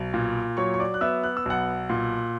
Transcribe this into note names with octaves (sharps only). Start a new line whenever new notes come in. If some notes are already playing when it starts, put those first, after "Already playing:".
Already playing: B1
A#2
F#3 C#5 C#6
C#6
D5 D6
F#6
B3 E5 E6
F#6
E6
B1 F#5 F#6
A#2